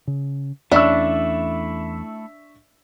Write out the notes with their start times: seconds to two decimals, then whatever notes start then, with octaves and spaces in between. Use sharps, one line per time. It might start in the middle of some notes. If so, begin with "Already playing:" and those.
0.07 C#3
0.72 E2 A3 C#4 D4 E4 E5 C#6 E6